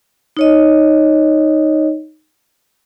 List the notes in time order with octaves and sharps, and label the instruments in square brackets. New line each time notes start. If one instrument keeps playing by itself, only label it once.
[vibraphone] D#4 C#5 D#5